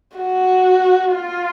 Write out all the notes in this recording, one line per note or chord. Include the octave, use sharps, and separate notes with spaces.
F#4
F4